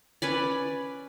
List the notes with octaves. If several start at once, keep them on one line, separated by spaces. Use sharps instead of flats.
C#4 B4 D5